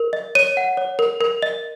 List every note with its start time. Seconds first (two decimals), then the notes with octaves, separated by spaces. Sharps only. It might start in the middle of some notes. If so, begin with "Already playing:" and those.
Already playing: A#4
0.13 D#5
0.35 C#5 D#7
0.57 F#5
0.77 C#5
0.99 A#4
1.21 A#4
1.42 D#5